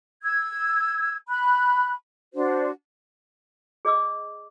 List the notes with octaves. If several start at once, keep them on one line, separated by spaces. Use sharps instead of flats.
E6 G#6
B5 F#6
D4 F#4 C5
G#4 D5 D#5 D6 E6